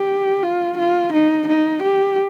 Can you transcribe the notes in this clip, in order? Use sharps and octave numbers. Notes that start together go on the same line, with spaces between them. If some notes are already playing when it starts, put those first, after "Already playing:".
Already playing: G4
F4
F4
D#4
D#4
G4